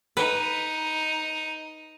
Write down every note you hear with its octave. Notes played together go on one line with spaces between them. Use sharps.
D#4 B4